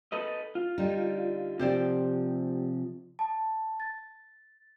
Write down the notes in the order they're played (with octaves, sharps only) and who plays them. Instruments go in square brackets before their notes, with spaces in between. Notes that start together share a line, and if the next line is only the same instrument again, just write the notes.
[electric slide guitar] A4 B4 D#5
F4
[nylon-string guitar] D3 G3 D#4
[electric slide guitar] C3 F3 [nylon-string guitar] G4 C5 D5
[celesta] A5
A6